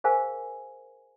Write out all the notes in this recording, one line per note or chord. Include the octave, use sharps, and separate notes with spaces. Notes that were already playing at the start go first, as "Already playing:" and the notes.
G#4 A#4 C5 F5 G#5